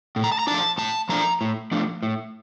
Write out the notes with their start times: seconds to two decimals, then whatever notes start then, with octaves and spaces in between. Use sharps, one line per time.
0.16 A2
0.24 A#5
0.32 A5
0.39 A#5
0.47 F3 A3 D4 A5
0.78 A2 A5
1.09 F3 A3 D4 A#5
1.41 A2
1.71 F3 A3 D4
2.03 A2